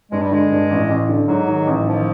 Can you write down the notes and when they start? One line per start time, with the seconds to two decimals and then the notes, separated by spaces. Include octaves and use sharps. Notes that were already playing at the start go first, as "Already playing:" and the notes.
0.12 G2 G#3
0.22 G3
0.31 D3 G#3
0.51 G2
0.70 A1
0.90 A1
1.09 D3
1.28 G#2 F#3
1.48 D#3
1.67 A1
1.86 D#3 F3